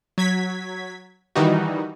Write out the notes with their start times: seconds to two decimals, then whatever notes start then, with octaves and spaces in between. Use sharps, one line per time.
0.18 F#3 G#6 B6
1.36 D#3 E3 G3 D#4 F#4